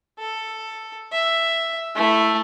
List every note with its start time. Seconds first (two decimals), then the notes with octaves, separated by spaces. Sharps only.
0.19 A4
1.12 E5
1.96 A3 E4